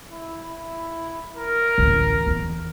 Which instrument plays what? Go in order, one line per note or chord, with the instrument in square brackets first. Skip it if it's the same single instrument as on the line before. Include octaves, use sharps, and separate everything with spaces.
[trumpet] E4
E4
A#4
[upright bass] A1 D2
E2